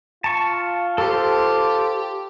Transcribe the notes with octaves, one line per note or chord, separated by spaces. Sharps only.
F4 A5 C#6
G4 A4 C5